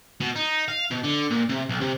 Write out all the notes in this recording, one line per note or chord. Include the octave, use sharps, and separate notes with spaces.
B2
D#4
F5
B2
D3
A#2
C3
B1
C3